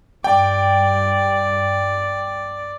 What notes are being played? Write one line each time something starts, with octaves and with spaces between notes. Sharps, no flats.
G2 D5 G5